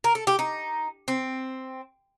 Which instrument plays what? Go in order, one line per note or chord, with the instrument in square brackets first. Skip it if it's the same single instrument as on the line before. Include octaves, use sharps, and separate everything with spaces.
[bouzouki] A#4
A4
G4
D#4
C4